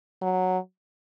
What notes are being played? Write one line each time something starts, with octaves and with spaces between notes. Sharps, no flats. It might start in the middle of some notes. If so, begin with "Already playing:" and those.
F#3